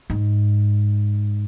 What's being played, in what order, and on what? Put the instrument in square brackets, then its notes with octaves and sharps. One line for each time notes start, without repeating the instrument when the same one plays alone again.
[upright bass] G#2